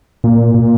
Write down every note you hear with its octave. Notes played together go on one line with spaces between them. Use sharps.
A#2
A#2